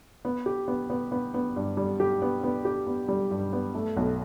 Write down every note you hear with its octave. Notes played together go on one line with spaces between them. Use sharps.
B3
G4
B3
B3
B3
B3
G2
G3
G4
B3
B3
G4
B3
G3
G2
B3
A3
B1